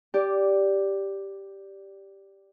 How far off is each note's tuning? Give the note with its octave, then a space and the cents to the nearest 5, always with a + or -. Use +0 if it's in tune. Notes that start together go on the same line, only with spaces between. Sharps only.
G4 +0 D5 -10